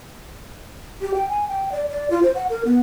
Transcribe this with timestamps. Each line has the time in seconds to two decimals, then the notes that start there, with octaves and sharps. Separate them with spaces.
1.01 G4
1.14 G5
1.29 G#5
1.48 G5
1.72 D5
1.89 D5
2.10 F4
2.23 C5
2.35 F#5
2.49 A#4
2.65 B3